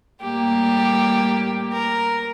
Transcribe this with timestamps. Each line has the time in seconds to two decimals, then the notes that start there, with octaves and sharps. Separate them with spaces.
0.22 A2 G3 A#3 G4
1.74 A#4